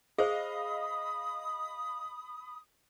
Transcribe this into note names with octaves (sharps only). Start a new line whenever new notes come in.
G#4 C5 D#5 F5 B5 D#6